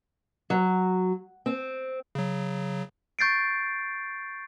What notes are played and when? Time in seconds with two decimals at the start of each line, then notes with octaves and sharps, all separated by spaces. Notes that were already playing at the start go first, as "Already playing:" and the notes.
0.50 F#3
1.46 C4
2.15 C#3 F#3
3.19 C#6 G6 A6 C7 D7